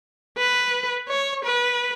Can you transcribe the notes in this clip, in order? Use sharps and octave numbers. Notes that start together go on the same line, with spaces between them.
B4
C#5
B4